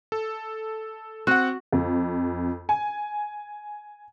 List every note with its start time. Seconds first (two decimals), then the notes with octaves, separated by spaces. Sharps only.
0.12 A4
1.27 C4 F#4 F#5
1.72 F2
2.69 G#5